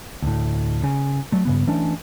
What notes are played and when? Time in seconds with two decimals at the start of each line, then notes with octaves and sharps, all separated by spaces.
0.22 D2 A2
0.84 C#3
1.32 F#3 A3
1.45 G2 C#3 B3
1.67 E3 A3 C#4 D4